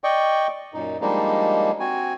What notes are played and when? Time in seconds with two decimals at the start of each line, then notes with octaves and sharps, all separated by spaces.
0.04 D5 D#5 G5 C#6
0.74 F#2 A#2 D#4
1.01 F3 G3 G#3 A#3 D4 D#4
1.80 C4 F#4 G#5